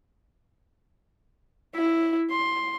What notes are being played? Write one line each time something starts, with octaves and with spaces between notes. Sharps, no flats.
E4
C6